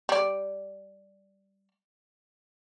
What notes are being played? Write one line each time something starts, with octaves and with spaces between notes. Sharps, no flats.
G3 D5